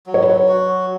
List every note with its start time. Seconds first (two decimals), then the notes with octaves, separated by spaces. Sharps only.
0.06 F#3
0.14 C#5
0.23 B4
0.29 C#5
0.48 F#4